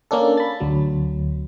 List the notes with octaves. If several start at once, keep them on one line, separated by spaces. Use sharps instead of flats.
A#3 C#4 D4 A4
B5 A6
D2 F#3